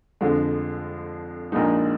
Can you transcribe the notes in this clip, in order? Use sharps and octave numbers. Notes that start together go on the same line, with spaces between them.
F2 D3 F3 G#3
A#1 A#2 G#3 D#4